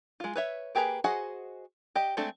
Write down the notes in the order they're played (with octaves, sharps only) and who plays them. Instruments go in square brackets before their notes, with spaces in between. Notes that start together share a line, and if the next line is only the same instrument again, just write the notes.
[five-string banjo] G#3 F4
B4 C#5 E5
A#3 G4 G#4 B4 A#5
F#4 G#4 C5 D#5 F#5
G4 D#5
G#3 A3 C4 D4 A4